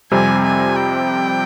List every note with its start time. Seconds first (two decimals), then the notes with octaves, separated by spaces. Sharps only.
0.11 F2 C3 G3 C4 G#5
0.44 G#5
0.76 G5